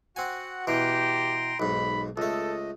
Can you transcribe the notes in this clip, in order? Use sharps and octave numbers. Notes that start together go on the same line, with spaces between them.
C4 F#4 F#5 G#5
B2 E3 G4 G5 A#5 C6
B1 G#2 B5
C#2 A3 A4 D#5